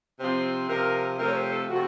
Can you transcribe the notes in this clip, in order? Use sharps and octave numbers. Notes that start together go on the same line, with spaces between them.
C3 F3 C4
C3 F3 C4 A#4
C3 F3 A3 C4 A#4
C#5
C5
A4
C3 F3 A3 C4 F#4